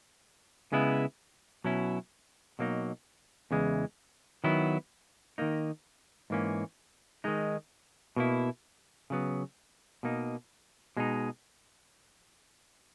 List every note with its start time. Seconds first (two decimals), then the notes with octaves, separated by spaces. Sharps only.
0.72 C#3 G#3 B3 E4
1.64 B2 F#3 C#4 E4
2.59 B2 F#3 A#3 D#4
3.51 E2 C#3 E3 G#3
4.44 D#3 F#3 B3 E4
5.38 D#3 A#3 D#4
6.30 G#2 E3 A#3 C#4
7.24 D#3 G#3 D#4
8.16 B2 A#3 E4
9.10 C#3 F#3 B3
10.03 B2 A#3 D#4
10.97 B2 G#3 D#4